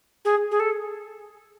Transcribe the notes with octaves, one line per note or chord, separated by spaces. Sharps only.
G#4
G#4
A4